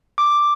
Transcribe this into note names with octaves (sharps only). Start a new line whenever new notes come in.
D6